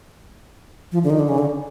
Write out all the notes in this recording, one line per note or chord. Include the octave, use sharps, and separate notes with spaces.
F3
D3
D#3
D3
C#3
D3